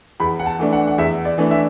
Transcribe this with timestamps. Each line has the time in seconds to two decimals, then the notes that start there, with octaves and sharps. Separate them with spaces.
0.20 E2 B5
0.40 F#5
0.46 A5
0.59 E3 A3 D4
0.73 F#5
0.87 F#5
0.98 E2 E5
1.25 D5
1.38 E3 A3 D4
1.51 E5